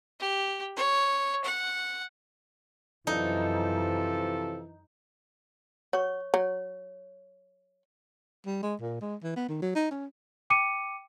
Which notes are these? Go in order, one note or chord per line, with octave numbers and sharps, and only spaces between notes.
G4
C#5
F#5
F#2 C3 E3 F3 D#4 A4
F#4 C#5 C#6
F#3 C#5
G3
G#3
A#2
G#3
E3
B3
D#3
F#3
D#4
C#4
G5 D6 C#7 D#7